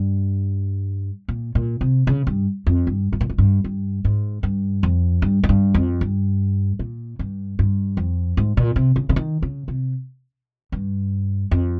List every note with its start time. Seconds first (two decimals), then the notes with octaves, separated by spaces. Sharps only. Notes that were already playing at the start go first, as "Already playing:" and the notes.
Already playing: G2
1.28 A#2
1.55 A#2
1.81 C3
2.07 C#3
2.27 G2
2.67 F2
2.87 G2
3.13 G#2
3.21 A#2
3.30 G#2
3.38 G2
3.64 G2
4.05 G#2
4.43 G2
4.83 F2
5.22 G2
5.44 G#2
5.49 G2
5.74 F2
6.01 G2
6.79 A#2
7.19 G2
7.59 G2
7.97 F2
8.37 G#2
8.57 A#2
8.76 C3
8.96 C#3
9.09 C#3
9.16 D#3
9.42 C#3
9.68 C3
10.72 G2
11.51 F2